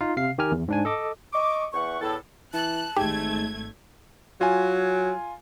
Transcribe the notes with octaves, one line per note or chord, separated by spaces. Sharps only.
D#4 F4 F5
C3 F5 C7
D#3 G4 A#4 G#5 F6
E2
G#2 D4 G#5
A4 D#5 D6
D#5 C#6 D6
E2 E3 F#5 C#6
E2 A2 A4
E3 A5 F#6
G#1 G#2 A3 G4 G#6
F#3 F4 G#5